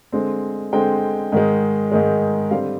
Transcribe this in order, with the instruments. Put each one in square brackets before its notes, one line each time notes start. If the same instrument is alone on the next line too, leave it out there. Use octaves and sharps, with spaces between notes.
[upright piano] D3 G#3 C4
D3 G#3 C4 G5
G#2 D#3 G#3
G#2 D#3 G#3
D3 G3 C4 F5